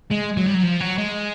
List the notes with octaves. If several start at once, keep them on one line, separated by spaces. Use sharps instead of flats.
G#3
F#3
G3
F#3
F3
F#3
G#3